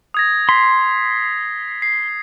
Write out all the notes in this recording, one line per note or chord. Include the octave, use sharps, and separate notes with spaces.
D#6 G#6 A#6
C6 B6 C7
C7